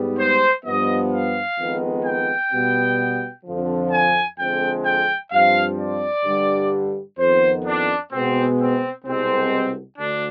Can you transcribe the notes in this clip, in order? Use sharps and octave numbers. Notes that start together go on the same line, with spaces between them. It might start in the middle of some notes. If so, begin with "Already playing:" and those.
Already playing: G#2 G3 B3
C5
G2 F3 B3 D#5
F5
F2 D#3 G#3 B3
G5
B2 G3 B3
F2 D3 F3
G#5
F2 D3 G#3 C4 G5
G5
G2 F3 C4 F5
D5
G2 D3 G3
F2 D#3 B3 C5
D4
B2 G#3 B3 C4
C4
C2 B2 G#3 C4
D2 D3 D4